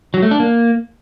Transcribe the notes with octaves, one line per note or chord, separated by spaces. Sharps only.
F#3
A3
D4
A#3